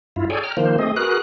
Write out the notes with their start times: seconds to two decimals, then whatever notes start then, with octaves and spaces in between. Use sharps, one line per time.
0.16 G2 E4 F4
0.30 G#4 A4 C#5 D5 G5 G#5
0.44 G5 A#5 F6
0.57 D#3 F3 A#3 C5
0.78 A3 C4 G#4 D#5
0.96 F#4 G#4 A#4 B4 F#6